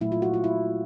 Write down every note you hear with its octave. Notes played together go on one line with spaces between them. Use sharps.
A#2 F#3 A3 E4
F4
F#4
F4
E4